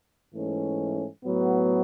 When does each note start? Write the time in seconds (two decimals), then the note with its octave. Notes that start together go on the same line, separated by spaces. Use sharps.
0.33 G#2 E3 A3 C#4
1.24 A2 F#3 B3